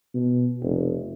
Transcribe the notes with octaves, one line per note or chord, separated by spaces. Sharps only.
B2
F1